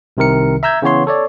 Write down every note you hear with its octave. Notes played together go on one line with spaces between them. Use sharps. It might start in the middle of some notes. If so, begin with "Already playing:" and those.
C2 C3 D#3 A#4 C#7
E5 A#5 E6 G6 G#6
C#3 E3 B3 C#5 C6
A4 C#5 D5